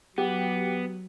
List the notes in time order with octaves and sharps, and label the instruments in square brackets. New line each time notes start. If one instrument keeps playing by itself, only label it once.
[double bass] F#3 [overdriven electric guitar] B3 [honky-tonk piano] G4